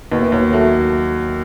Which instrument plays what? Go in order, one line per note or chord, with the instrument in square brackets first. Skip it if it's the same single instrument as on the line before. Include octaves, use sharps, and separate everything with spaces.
[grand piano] D#2 [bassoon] B2
[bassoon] E3
[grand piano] D#2 [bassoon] F#3
[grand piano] F#3 [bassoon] A3